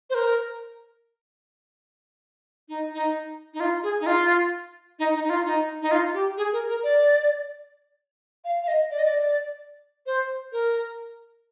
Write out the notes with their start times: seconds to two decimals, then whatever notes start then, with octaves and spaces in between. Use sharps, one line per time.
0.10 C5
0.15 A#4
2.69 D#4
2.94 D#4
3.54 D#4
3.60 F4
3.83 G#4
4.01 D#4
4.06 F4
4.99 D#4
5.15 D#4
5.25 D#4
5.30 F4
5.45 D#4
5.82 D#4
5.91 F4
6.14 G4
6.37 G#4
6.53 A#4
6.69 A#4
6.84 D5
8.45 F5
8.63 F5
8.68 D#5
8.91 D5
8.99 D#5
9.05 D5
10.06 C5
10.52 A#4